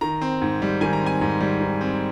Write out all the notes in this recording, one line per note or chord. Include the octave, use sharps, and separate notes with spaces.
D#3 A#5
C4
G#2
G3
D#3 G#5
A#5
C4
G#5
G#2
G3
D#3
C4